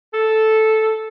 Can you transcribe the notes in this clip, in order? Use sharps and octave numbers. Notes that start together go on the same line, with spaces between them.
A4